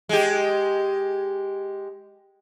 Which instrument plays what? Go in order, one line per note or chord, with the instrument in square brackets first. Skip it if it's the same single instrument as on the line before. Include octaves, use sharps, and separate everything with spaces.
[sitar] G#3 G4